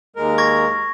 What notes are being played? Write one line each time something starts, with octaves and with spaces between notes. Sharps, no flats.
D#2 G#3 A#4
C#6 G#6 A#6